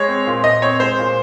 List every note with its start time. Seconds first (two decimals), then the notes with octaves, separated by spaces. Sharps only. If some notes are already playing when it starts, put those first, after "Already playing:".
Already playing: G#3 C#5
0.08 C4
0.27 A#2
0.44 A#2 D#5
0.62 C4 C#5
0.80 G#3 C5
0.99 A#2